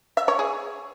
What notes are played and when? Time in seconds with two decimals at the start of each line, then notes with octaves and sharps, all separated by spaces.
0.17 E5
0.28 C#5
0.39 G#4